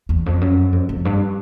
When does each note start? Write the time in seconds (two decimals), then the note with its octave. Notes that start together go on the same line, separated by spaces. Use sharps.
0.09 E2
0.26 F2
0.41 F#2
0.72 F2
0.89 F2
1.05 G2